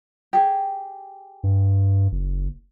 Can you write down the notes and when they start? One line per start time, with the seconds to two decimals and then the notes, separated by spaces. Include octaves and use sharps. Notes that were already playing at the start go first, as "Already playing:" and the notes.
0.33 G4 G#4
1.43 G2
2.12 F#1